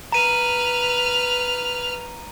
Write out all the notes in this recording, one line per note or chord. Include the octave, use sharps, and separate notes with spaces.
B4 A#5 F6 D#7